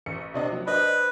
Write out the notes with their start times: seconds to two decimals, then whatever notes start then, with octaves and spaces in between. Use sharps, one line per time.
0.06 A1 C#7
0.34 C3 D4 D#5
0.52 F#3
0.67 D4 B4 C5 D#5